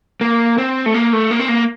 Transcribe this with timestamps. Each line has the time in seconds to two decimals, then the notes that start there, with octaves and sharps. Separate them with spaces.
0.21 A#3
0.58 C4
0.86 A3
0.94 A#3
1.13 A3
1.31 A#3
1.39 C4
1.48 A#3